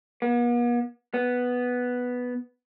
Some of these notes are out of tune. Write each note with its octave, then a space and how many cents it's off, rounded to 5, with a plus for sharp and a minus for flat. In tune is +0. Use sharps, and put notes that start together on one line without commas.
B3 -45
B3 +0